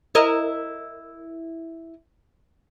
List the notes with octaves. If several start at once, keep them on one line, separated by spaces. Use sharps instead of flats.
E4 A#4 D#5